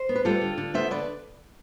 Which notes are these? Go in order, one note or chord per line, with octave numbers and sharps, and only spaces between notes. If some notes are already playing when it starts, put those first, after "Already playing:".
Already playing: C5
B3
B4
G3 F4 A4
D3
D3
B3 C5 E5
D3 B4 D5